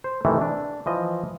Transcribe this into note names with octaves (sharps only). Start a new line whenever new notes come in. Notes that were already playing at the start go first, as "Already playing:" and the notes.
C5
C3 D#3 E3 A3
D4
E3 F3 D#5